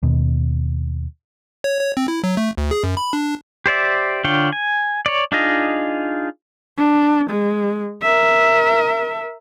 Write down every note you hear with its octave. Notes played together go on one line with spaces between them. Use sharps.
D#2 B2
C#5
C#5
C4
E4
F#3
A3
D2
G#4
F#2
B5
D4
G4 C5 D5 E5
D3 D4 F4 C#5 G5
G#5
C#5 D5
D4 D#4 F4 G#4 D#5
D4
G#3
A#4 E5